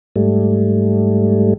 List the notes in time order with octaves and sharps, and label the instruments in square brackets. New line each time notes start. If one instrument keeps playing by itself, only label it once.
[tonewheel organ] G#2 G3 A3